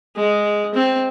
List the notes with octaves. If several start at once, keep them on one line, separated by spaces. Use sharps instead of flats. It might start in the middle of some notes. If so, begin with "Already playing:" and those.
G#3
C4